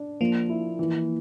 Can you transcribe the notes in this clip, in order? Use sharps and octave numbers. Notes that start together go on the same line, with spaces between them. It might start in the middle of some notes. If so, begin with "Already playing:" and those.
Already playing: D4
F3 A#3
E4
E3